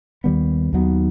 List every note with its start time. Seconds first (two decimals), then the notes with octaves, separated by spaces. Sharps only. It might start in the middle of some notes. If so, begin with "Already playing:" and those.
0.24 D#2 D#3 G3 B3
0.73 D#2 D#3 F#3 B3